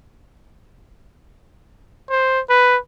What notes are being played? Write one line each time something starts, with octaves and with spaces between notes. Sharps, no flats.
C5
B4